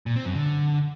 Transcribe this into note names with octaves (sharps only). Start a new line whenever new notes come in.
A#2
C4
F#2
D3